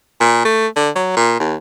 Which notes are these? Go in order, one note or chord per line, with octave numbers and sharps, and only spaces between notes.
A#2
A3
D3
F#3
A#2
D#2